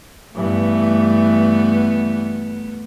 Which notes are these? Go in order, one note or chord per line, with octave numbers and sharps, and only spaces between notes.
G2 E3 A3 B3